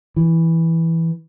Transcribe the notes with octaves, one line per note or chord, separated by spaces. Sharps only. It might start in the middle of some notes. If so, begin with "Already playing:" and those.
E3